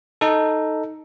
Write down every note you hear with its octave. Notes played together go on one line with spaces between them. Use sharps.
D#4 A4